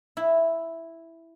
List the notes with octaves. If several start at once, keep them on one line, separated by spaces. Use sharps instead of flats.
E4